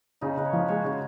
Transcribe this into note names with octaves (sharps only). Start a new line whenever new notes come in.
C#3 D#4
C#3 B4
C#5
F3
G#3 C#5
C#3 F#4
F4